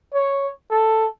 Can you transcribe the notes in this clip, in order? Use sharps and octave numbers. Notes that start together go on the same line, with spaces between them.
C#5
A4